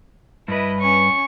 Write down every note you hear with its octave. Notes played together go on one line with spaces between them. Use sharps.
G2 E4 B4 D#5
C#4 C#6